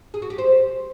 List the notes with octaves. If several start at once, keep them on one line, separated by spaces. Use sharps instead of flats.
G#4
F#4
G4
C5